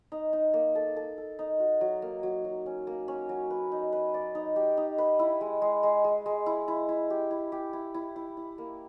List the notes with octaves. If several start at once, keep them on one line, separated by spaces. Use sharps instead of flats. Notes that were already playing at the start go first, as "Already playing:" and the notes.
D#4
D#4
A#3
A4
A4
A4
D#4
F#4
F#3
A#3
F#3
F#3
C#4
A#3
C#4
F#3
B4
D#4
B4
D5
D#4
G4
D#4
B4
E4
G#3
G#3
G#3
G#3
G#3
E4
E4
E4
G4
E4
G4
E4
E4
E4
E4
A#3